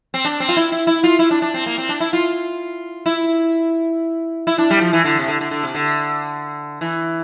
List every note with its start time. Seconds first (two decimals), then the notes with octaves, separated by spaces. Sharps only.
0.14 C4
0.25 D4
0.40 C4
0.49 F4
0.57 E4
0.72 E4
0.87 E4
1.04 F4
1.19 E4
1.31 D4
1.42 D4
1.54 C4
1.66 A#3
1.78 C4
1.89 D4
2.00 E4
2.13 F4
3.06 E4
4.47 E4
4.58 D4
4.70 G3
4.81 F3
4.93 E3
5.04 D3
5.19 C3
5.28 D3
5.41 D3
5.51 D3
5.63 C3
5.75 D3
6.81 E3